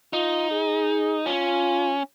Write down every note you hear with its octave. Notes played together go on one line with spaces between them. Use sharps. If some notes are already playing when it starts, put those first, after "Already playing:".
D#4 F4
G#4
C#4 F4